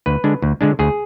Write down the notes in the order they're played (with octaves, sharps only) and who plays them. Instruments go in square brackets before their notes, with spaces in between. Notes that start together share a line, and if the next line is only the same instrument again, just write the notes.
[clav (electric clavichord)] D2 B4
D3 G#3 D4
D2
D3 G#3 D4
D2 G#4